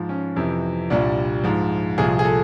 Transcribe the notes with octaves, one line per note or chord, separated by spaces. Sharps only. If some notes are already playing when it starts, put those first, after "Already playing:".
Already playing: G#2 F3
C#4
F2 C3 E3
C2 A#2 G3 D4
G#2 F3
C2 A#2 F3 G#4
G#4
A4